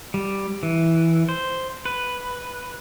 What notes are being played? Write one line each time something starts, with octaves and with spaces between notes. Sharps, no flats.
G3
E3
C5
B4